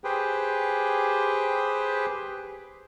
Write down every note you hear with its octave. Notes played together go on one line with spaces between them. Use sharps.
G4 G#4 B4 C5 G5